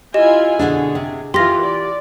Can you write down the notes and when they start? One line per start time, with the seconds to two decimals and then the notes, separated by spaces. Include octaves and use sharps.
0.14 E4 F4 G4 D#5 G#5
0.59 B2 D3 D4 G#4
0.95 C3
1.34 E3 F4 G4 C6 A#6
1.63 D5